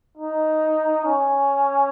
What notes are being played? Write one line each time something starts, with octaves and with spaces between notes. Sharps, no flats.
D#4
C#4